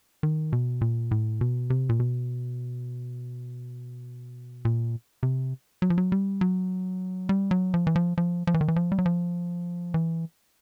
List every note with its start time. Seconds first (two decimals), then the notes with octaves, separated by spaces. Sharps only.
0.23 D#3
0.53 B2
0.81 A#2
1.11 A2
1.41 B2
1.70 C3
1.89 A#2
2.00 B2
4.65 A#2
5.23 C3
5.82 F#3
5.90 F3
5.98 F#3
6.12 G3
6.41 F#3
7.29 G3
7.51 F#3
7.74 F3
7.87 E3
7.96 F3
8.18 F3
8.47 F3
8.54 E3
8.61 D#3
8.68 E3
8.76 F3
8.92 G3
8.99 F#3
9.06 F3
9.94 E3